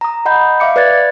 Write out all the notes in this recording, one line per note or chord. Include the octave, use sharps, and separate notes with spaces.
A#5 D#6
D#5 F#5 B5 G6
E5 F5 D6 C#7
B4 D5 F#6 G#6 A6